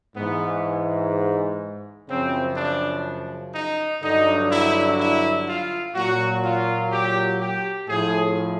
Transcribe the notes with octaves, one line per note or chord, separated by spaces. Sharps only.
G#2 E3 B3
F#2 C#3 F3 C4
D4
D#4
G2 D3 F#3 D#4
E4
E4
F4
A#2 F#3 F#4
F4
G4
G4
A2 F3 G#4